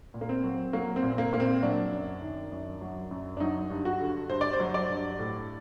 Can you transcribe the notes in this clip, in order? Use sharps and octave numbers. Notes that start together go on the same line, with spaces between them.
A#2
A#3
C4
F#3
F#3 A#3
C4
A#2
C4
A#3
A#2 A#3
C4
F#3 D4
F#2
D#3
F#2
F#3
F#2
D4
F#3 D#4
G2
F#4
D3
G2 C5
D5
C5
F#3
D5
G2
A2